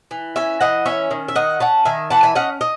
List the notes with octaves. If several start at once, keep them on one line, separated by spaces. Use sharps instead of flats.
E3
C#4 E5 G#5
E3 D#5 F#5
C#4 C#5 E5
D#3
E5
D#3 D#5 F#5
C#4 F#5 A5
D#3 E5 G#5
E3 F#5 A5
E5 G#5
C#4 D#5 F#5
D#5